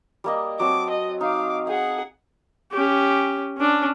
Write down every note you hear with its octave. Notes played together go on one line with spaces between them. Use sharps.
G3 A#3 D#5
F#3 C4 A5 D6
D#5
D#4 F5 D6
G#4 F5 F#5
C#4 G4
C#4 D4